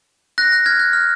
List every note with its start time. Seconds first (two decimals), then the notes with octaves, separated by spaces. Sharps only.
0.38 F#6 A#6
0.52 F#6 A#6
0.66 F6 G#6
0.79 F#6
0.93 F6